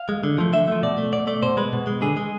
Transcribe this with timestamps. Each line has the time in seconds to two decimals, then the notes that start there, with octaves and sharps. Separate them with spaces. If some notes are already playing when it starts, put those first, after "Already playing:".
Already playing: F5
0.09 G#3
0.24 D3
0.38 F3 A3
0.53 D3 E5
0.68 F3 A3
0.83 B2 D5
0.98 A3
1.13 B2 D5
1.27 A3 D5
1.43 B2 C5
1.57 G#3 B4
1.73 B2
1.87 G#3
2.02 D3 G#4
2.17 G#3